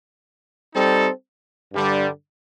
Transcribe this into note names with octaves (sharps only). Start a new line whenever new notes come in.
G3 C4 D#4 A4
G2 D3 G3 D4